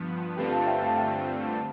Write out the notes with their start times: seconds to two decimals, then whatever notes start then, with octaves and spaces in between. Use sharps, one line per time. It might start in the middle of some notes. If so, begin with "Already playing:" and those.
Already playing: G2 F3 B3
0.36 G2 D3 A3 C4 F4 G4 B4
0.52 F5 A5
0.67 E5 G5
0.83 F5 A5
0.97 E5 G5